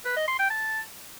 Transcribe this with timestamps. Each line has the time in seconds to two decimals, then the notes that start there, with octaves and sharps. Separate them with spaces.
0.05 B4
0.16 D#5
0.28 C6
0.39 G5
0.50 A5